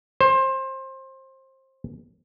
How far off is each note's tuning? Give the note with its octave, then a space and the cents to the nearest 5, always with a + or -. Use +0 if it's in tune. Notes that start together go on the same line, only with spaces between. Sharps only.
C5 +25